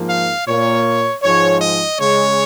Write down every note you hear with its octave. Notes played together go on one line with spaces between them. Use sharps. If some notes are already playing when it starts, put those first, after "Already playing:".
Already playing: G#2 F3 A#3
F5
A#2 A#3 C#5
G#2 F3 G#3 C#5
D#5
C#3 G#3 C#5